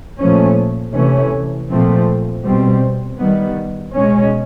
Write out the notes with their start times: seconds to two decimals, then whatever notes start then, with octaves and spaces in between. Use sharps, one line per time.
0.19 A#2 F3 A3 C#4
0.94 C3 E3 A3 C#4
1.69 A#2 F3 A3 C4
2.44 B2 G3 C4
3.20 D#3 G3 B3
3.94 B2 G#3 C#4